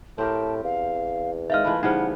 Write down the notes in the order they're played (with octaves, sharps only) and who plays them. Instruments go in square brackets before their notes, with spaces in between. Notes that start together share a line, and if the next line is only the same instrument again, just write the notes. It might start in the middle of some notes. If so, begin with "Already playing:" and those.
[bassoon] A2 [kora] C4 G4 A#4 [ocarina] A5
[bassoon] E2 [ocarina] F5
[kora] D#3 G#3 [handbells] E5 F5 F6
[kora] E3 F3 A3 [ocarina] B5
[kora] C#3 G3 B3 [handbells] D#4 E4 C5 [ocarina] F#5